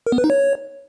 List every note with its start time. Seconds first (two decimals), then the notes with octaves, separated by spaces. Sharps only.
0.07 A#4
0.12 B3
0.18 B4
0.24 D#4
0.30 C#5